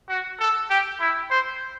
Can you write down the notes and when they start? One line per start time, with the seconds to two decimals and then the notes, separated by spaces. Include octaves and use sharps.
0.09 F#4
0.40 A4
0.70 G4
1.00 E4
1.30 C5